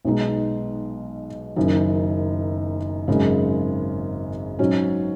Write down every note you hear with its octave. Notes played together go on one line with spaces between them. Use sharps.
B1 B2 G#3 D#4
F#1 F#2 D#3
G#1 F#2 C#3 G#3
G#2 F#3 C#4